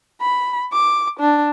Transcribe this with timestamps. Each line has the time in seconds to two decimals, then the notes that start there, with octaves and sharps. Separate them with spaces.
0.21 B5
0.73 D6
1.20 D4